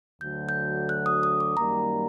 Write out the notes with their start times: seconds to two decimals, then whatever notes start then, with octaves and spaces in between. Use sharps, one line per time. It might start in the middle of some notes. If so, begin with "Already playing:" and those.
0.21 D2 D3 F#3 G6
0.49 G6
0.89 F#6
1.06 D#6
1.23 D#6
1.40 D6
1.57 F#2 D#3 G3 A#3 A#5